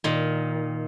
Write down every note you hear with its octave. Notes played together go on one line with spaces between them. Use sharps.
A#2 D#3